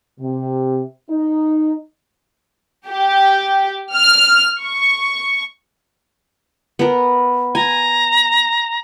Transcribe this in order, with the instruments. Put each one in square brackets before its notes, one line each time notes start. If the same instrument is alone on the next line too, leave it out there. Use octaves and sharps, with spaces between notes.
[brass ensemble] C3
D#4
[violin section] G4
F6
C#6
[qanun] B3 A#4
[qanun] G#5 [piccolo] A#5